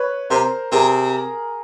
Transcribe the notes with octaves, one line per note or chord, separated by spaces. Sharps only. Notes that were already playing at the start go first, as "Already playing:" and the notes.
Already playing: B4 C#5
C3 A#4 C5
C3 G#4 A#4